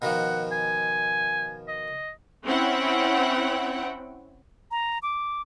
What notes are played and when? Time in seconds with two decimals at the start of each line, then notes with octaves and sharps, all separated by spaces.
0.02 B2 D#3 F3 F#5
0.52 G#5
1.68 D#5
2.45 C4 C#4 E4 F#5 G5
4.71 A#5
5.03 D6